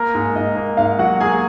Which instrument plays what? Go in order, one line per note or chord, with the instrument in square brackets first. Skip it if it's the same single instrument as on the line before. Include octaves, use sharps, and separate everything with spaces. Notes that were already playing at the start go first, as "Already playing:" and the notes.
Already playing: [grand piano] A#3 A#4 A#5
G#2
G#2 D#5
A#3
G#2 F5
F#3 F#4 F#5
A#3 G#4 G#5